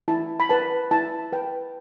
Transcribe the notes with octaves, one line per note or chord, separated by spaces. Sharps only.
E4 A5
B5
B4 A5
E4 A5
B4 G5